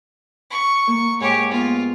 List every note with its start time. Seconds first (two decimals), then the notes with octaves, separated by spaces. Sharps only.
0.51 C#6
0.88 A#3
1.21 G#2 G4 C#5 G#5
1.52 B3 F4